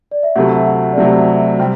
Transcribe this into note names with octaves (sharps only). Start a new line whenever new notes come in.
D5
E5
D2 C3 F#3 A3 F#5
E5
F#5
D5
D2 C3 F#3 A3 E5
F#5
E5
C3 G3 C4 G5